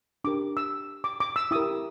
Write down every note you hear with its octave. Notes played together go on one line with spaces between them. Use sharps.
D4 G4 A#4 D6
E6
D6
D6
E6
E4 G4 A#4 D#6